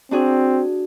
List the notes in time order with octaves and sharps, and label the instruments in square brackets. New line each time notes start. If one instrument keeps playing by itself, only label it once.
[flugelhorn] C4 [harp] D4 F#4 G#4